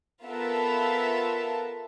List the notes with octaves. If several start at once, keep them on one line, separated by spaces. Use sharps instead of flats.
B3 F4 A4 A#4 E5 A5